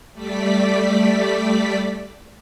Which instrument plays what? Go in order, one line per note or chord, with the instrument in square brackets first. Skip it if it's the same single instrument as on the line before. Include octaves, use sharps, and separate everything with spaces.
[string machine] G3 A3 D5 B6